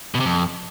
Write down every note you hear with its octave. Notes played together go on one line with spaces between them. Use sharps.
B2
C3
F2